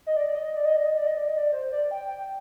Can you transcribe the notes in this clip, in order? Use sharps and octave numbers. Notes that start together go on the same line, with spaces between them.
D#5
D5
D5
D#5
D5
D#5
D5
D#5
D5
D#5
D5
D#5
D5
C5
D5
G5
G5